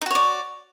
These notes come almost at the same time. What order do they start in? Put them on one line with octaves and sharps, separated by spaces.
D#4 F#4 C#5 D5